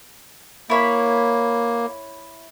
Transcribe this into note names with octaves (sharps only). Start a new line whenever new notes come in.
A#3 E4 C#5 B5